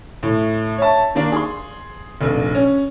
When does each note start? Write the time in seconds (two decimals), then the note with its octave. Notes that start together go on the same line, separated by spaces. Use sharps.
0.23 A2
0.78 C#5 E5 A5
1.15 D#3 A#3 D4
1.32 G#4 C6
2.21 F1 A#1
2.55 C#4